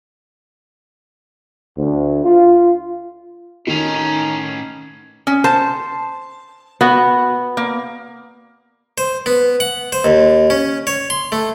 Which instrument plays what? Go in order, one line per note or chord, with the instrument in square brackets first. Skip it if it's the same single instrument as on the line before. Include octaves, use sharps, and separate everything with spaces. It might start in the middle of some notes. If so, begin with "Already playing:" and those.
[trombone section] D2
F4
[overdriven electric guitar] A2 C#4 [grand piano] D#3 [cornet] D#4
[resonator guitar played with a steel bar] C#4
[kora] C5 [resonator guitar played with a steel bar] A5
[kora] B3 [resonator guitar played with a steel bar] F#4
[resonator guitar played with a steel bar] A#3
[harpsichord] C5
B3
F#5
C5
D#2
C#4
C#5
C6
A3